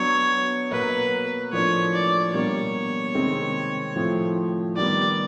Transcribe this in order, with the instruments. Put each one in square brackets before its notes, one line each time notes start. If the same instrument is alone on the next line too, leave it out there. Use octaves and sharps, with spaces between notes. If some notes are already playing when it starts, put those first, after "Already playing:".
Already playing: [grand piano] F#3 B3 D4 [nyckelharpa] C#5
[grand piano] B2 F#3 A#3 [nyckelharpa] B4
[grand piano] A2 F3 A#3 D4 [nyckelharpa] C#5
[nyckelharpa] D5
[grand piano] B2 G3 A#3 D4 [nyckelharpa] C#5
[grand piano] C3 D#3 G#3 C4
A2 F3 A3 C4
[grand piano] D#3 G3 B3 [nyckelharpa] D5